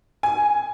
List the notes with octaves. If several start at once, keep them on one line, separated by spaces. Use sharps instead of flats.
G#5